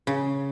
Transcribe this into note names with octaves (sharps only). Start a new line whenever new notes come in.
C#3